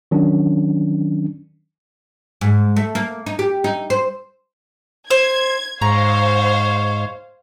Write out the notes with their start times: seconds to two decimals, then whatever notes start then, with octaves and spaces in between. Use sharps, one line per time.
0.11 D#3 F#3 C#4 D4
2.41 G#2
2.76 A3
2.95 A#3
3.26 D#4
3.39 G4
3.64 D#4
3.90 C5
5.11 C5 G#6
5.81 G#2 C5 C#5 F5 A#5